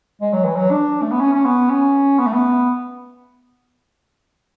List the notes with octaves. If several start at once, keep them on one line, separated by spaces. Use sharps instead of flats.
G#3
F#3
E3
F#3
D4
A3
B3
C#4
C#4
B3
C#4
B3
A3
B3